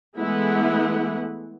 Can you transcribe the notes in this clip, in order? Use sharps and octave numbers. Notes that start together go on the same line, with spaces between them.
E3 G#3 A3 B3 E4 F#5